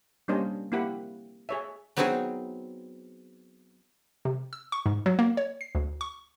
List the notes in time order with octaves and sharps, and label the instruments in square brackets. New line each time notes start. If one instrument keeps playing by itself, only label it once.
[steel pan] G3 A#3 C#4 D4 C5 D#5
A#3 C4 E4 G4 F#5 B5
G#4 C#5 E5
[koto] F#3 B3 C4 D#4 F#4 G#4
[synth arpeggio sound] C3
E6
C#6
G#2
F#3
A#3
C#5
C7
D2
C#6